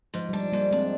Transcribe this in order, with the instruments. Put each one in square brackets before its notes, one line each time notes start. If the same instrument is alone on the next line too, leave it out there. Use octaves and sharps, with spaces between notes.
[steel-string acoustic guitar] G#2 [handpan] F3
[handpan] G3
[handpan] F3 [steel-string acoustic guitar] D4
[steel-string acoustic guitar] G#2 [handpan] G3 A#3
[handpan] G#3 C4 [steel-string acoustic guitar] D4